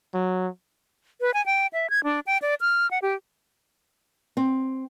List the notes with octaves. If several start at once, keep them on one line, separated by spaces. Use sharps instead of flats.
F#3
B4
G#5
G5
E5
G#6
D4
G5
D5
F6
F#5
G4
C4